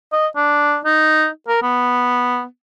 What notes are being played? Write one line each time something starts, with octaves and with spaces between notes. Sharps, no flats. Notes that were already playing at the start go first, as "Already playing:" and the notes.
D#5
D4
D#4
A#4
B3